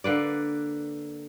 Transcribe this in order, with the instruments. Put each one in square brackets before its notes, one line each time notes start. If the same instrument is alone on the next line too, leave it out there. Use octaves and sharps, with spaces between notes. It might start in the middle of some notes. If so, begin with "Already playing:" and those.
[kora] D3 A#3 B4 D5